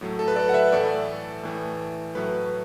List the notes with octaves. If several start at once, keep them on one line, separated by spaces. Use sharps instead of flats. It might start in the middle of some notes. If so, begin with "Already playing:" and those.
A2 F#3 A3
A4
B4
A4 D5
F#5
B4 E5
A2 E3 A3 A4 D5
A2 E3 A3
A2 F#3 A3 B4